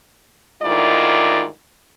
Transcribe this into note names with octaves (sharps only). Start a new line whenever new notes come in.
D2 G#2 D#3 E4 F4 D5